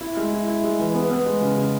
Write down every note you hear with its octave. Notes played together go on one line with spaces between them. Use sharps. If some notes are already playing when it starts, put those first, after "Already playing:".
E4
G#3
E4
E4
G#3
E3
B3
B3
G#3
C#3
C#3